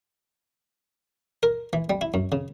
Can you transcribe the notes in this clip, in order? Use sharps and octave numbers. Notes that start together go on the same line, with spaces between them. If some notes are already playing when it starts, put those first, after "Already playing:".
A#4
E3
G3
E4
F#2
C#3